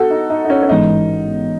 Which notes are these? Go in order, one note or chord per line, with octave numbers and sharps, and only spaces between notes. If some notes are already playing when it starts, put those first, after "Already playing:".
Already playing: B3 F#4 A4
D#4
D#4
D#4
C#4
C#4
A1 G#2 E3 G#3 B3 D#4